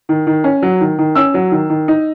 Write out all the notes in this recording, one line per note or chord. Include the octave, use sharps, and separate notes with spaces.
D#3
D#3
C#4
F#3
D#3
D#3
C#4 E6
F#3
D#3
D#3
D#4